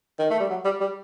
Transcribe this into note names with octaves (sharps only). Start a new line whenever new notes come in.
D#3
A3
G3
F#3
G3
G3